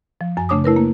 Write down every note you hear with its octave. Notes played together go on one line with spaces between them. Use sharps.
F3
F#2 G#5
C#3 A3 D4 C#5 D6 D#6
A3 E4 A#4 B4
A#3